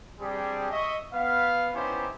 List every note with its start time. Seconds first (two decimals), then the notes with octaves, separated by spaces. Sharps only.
0.20 G3 C4 D4 G4 G#4
0.71 D#5 E5 C#6
1.13 B3 F5
1.74 B3 C#4 D#4 E4 G4 C5